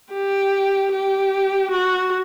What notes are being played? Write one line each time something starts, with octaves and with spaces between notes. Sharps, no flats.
G4
G4
F#4